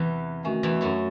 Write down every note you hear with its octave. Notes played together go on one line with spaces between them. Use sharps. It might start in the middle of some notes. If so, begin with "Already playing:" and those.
Already playing: E2 C3 E3
D#3 A3 C#4 F#4
E2 E3
F#2 F#3